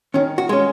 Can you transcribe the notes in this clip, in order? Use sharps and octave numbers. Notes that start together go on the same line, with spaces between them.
D#3 C#4
F#4
G#3 C#4